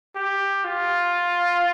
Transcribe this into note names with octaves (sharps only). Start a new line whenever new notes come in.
G4
F4